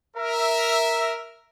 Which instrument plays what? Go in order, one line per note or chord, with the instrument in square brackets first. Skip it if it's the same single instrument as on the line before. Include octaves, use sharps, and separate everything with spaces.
[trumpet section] A#4 E5